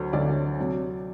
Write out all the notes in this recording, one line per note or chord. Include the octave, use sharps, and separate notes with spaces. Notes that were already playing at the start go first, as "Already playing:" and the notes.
Already playing: D2 D3 F#3 C5
D2 D3 F#3 D5
C3 F#3